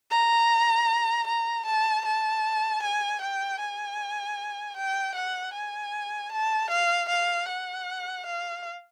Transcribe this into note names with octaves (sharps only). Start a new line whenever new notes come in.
A#5
A#5
A5
A5
G#5
G5
G#5
G5
F#5
G#5
A5
F5
F5
F#5
F5